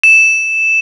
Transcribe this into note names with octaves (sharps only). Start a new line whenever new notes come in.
E7